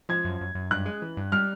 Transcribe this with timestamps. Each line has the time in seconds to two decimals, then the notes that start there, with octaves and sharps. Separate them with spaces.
0.09 F3 G#6
0.24 F#2
0.41 F#2
0.55 F#2
0.71 G2 F#6
0.86 G#3
1.02 E3
1.17 G2
1.32 G3 F6